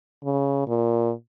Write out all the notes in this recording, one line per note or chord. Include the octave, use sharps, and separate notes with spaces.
C#3
A#2